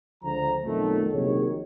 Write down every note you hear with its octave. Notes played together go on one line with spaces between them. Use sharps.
C#2 D3 F3 A#5
B1 F2 D#3 F#3 A3
A#1 C3 D#3 F#3 G#4 C#5